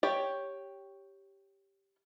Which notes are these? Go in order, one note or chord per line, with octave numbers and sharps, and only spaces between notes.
G4 C#5 G5